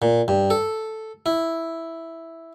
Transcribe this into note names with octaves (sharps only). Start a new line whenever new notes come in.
A#2
G2
A4
E4